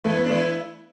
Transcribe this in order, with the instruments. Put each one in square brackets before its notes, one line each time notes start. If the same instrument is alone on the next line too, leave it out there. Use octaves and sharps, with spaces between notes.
[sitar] E3 E4 [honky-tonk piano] A3
[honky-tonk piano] B3
[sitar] D4
[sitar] E3 E4 [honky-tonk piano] A3